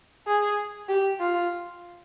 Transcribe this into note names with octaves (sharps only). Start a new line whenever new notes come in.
G#4
G4
F4